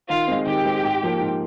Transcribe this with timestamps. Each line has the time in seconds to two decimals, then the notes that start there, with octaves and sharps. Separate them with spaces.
0.09 D#3 F4 F5
0.27 G#3 C4
0.46 D#3 G4 G5
0.65 G#3 C4
0.83 G#2
1.03 F3 A#3
1.21 G#2